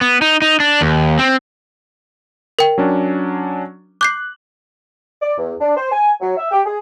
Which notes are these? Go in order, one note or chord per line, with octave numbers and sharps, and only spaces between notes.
B3
D#4
D#4
D4
D#2
C4
A#4 G5
F#3 C#4 D4
D6 F#6 G6 C7
D5
E2
D4
C5
G#5
F#3
E5
G4
G#4